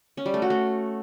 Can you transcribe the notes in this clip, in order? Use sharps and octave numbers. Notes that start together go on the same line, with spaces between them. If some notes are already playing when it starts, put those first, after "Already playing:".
C#4
G3
A3
F#4
A3